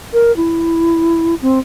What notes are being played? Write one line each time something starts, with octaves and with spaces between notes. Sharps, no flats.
A#4
E4
C4